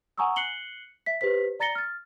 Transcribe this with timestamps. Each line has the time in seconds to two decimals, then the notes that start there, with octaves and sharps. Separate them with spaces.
0.18 F#5 G#5 A#5 C#6 D#6 E6
0.36 F#6 C7 C#7 F#7 G7
1.06 E5 B6
1.21 G4 B4 C5 B6
1.60 D5 A#5 A6 A#6 C#7 G7
1.75 F6 A6